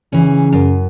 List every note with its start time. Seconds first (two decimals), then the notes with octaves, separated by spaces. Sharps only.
0.12 C#3 E3 C#4
0.53 F#2